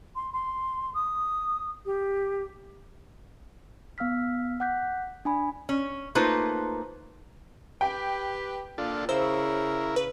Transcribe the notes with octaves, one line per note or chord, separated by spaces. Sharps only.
C6
C6
D#6
G4
B3 F5 E6 F6 B6
F#5 D6 F#6 G6 B6
D4 G#5 B5
C#4
A3 A#3 D#4 F4 B4 C5
G4 B4 G5
A#2 D4 F4 A4
C#3 E4 A#4 C5 E6
B4